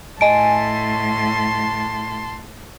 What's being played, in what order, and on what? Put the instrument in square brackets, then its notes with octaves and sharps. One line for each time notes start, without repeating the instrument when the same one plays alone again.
[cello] A2 [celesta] D#5 D7 [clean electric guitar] G#5 [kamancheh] A5 C6